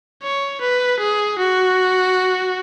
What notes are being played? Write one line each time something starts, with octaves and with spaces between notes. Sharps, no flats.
C#5
B4
G#4
F#4